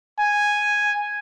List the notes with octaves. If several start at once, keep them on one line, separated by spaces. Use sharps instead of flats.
G#5